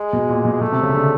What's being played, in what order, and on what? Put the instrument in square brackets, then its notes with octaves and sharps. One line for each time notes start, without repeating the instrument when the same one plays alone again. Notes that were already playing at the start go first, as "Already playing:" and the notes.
Already playing: [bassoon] G#3
[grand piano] B2
A#2
B2
[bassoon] G#3
[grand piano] B2 [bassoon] A3
[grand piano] C3
C#3
D3